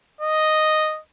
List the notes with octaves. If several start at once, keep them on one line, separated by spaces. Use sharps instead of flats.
D#5